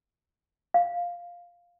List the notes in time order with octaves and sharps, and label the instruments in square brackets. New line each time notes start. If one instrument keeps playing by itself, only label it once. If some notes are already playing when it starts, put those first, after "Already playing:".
[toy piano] F5